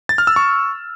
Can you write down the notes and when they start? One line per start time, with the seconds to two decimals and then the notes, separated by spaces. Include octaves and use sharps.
0.09 A6
0.18 F6
0.27 E6
0.36 C#6